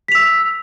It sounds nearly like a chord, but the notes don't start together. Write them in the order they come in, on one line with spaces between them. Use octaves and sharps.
B6 F7 E6